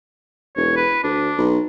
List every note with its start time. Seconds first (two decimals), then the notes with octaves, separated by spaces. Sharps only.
0.56 E1 C#5
0.76 B4
1.04 D2 D4
1.38 B1